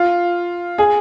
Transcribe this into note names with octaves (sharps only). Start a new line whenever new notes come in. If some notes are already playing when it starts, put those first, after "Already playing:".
Already playing: F4
G#4